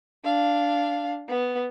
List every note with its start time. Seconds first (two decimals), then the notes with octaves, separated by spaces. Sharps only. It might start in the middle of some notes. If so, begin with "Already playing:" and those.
0.25 D4 F5
1.29 B3